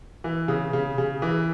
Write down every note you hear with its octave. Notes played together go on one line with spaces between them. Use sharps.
E3
C#3
C#3
C#3
E3